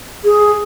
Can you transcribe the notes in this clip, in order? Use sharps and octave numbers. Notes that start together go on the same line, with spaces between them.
G#4